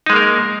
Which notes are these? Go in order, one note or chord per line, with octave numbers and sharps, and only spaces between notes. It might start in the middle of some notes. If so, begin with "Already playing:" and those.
G#3 A#3 D#4 A#4